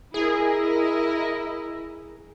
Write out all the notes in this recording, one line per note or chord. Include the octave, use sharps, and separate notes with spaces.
E4 G#4 A#4 D#5